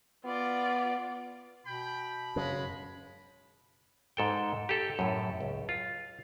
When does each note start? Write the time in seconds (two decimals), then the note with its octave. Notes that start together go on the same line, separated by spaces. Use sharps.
0.25 B3 F4 D5
1.67 B2 G5 B5
2.36 F#2 C#3 G#3
4.17 G#2 A4 G5
4.69 G4 A4
4.99 F#2 A2
5.41 C#2
5.69 F4